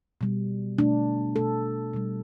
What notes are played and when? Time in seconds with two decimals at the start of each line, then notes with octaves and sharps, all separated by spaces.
0.21 B2 G3
0.78 B2 A3 D4
1.36 B2 A3 A4
1.93 B2 G3